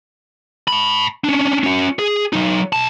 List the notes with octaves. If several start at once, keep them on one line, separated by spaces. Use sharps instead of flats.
A5 B5
C#4 D4
C#4 F#4
G#4
F#3 D#4
B1 A5